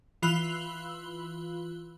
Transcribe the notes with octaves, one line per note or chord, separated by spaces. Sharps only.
E3 F4 B5 E6 F#6 G7